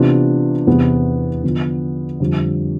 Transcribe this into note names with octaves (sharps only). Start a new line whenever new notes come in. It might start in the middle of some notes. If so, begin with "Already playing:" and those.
Already playing: C3 E3 B3 D4 F4
E2 C3 E3 B3
D3 F3 B3
F2 D3 G3 D4